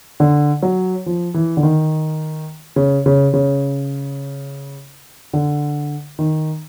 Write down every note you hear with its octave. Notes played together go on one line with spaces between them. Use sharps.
D3
F#3
F3
E3
D3
D#3
C#3
C#3
C#3
D3
D#3